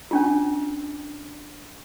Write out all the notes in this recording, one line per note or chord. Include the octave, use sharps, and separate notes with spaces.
C#4 D4 F4